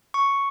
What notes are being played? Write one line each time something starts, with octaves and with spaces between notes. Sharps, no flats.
C#6